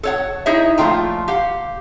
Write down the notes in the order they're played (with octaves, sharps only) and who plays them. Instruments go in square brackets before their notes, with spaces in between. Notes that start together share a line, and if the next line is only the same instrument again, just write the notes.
[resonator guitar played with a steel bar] A4 C#5 F#5
D#4 E4 G#4 C#5 D#5 E5
A#2 F3 A3 F4 G5 A#5
G4 F5 F#5